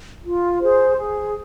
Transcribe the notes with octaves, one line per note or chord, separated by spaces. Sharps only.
F4
G#4 C5
G#4